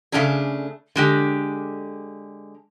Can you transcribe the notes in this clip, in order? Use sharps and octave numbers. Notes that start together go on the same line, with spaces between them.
C#3 E3 A3 C#4 D4 G#4
D3 G#3 G4